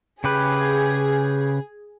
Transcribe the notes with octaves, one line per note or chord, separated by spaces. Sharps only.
C#3 G4 G#4 B4